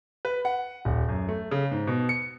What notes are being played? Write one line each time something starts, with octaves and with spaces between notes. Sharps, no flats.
B4
F#5
D#1
F#2
A3
C#3
G#2
B2
C#7